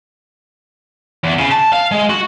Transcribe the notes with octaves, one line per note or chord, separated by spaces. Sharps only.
E2
C#3
A5
F5
G#3
F#4